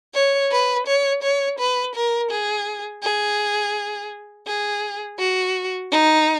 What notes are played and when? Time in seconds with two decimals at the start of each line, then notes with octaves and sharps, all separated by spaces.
0.14 C#5
0.51 B4
0.87 C#5
1.23 C#5
1.59 B4
1.95 A#4
2.31 G#4
3.03 G#4
4.47 G#4
5.18 F#4
5.92 D#4